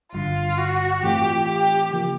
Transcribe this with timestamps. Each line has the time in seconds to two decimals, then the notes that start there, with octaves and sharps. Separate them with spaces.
0.12 G1 G2 D3 F4
0.58 F#4
1.02 A2 E3 A3 C4 F4 G4
1.47 G4
1.91 C#3 F3 A#3